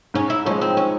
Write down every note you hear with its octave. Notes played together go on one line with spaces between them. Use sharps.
G#2 C#4
E4
F3 G#3 C#4
C4
C#4